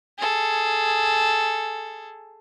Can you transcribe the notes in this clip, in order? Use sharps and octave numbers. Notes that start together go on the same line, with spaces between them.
G#4 A4